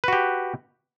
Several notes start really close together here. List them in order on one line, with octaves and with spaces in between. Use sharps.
B4 F#4 G4